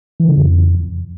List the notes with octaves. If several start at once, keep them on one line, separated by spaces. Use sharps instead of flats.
E3
C#3
F2